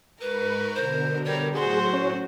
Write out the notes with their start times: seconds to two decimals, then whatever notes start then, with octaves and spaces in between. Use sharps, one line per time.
0.21 G#2 A#4 B4 B5 C#6
0.74 B2 D3 C5
1.25 G3 A#4 C#5
1.55 A2 F#3 F#4 G#4 C5 C6
1.93 C#4 C#5